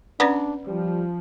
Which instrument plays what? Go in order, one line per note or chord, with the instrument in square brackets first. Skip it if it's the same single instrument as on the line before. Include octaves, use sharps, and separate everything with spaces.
[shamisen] B3 [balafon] C#4 B4 D5 [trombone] D4
[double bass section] F3 [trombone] G3